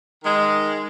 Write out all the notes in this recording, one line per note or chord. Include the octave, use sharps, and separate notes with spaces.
D#3 G#3